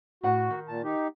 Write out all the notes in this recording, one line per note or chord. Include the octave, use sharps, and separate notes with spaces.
A2 F#4 F#5
D#3
A#2 A5
D#4 G4